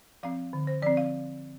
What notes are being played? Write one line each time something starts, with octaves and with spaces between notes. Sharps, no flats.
F3 C4 F5
D3
C5
F3 C4 D5
F5